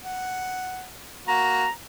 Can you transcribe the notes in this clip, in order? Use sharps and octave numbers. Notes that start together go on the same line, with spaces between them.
F#5
A#3 F#4 A#5